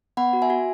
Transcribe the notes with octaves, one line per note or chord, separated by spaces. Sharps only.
B3 F#5 B5
F#4
E5 G#5
F#4